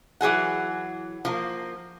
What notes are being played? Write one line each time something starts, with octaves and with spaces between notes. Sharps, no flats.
E3 F#3 G#4 F#5
F3 A#3